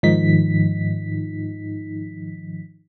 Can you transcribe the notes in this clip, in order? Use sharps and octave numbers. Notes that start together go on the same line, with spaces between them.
G#2 D#3 F3 D#4 B6